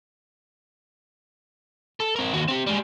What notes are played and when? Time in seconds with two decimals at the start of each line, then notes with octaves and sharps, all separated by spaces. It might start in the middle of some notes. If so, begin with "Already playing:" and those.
2.00 A4
2.16 C4 A#4
2.33 D#2 F#4
2.48 C4 G4
2.67 G3 G#3